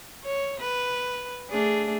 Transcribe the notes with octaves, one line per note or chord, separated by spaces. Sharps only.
C#5
B4
A3 D4 G#4